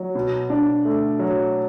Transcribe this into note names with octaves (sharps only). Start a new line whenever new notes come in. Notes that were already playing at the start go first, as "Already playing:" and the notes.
Already playing: F#3
B2
D4
A3
F#3